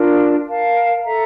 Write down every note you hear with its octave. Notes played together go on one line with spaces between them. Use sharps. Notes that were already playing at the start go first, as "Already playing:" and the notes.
Already playing: D4 F4 A#4
A#4 F5 A5
A4 E5 A#5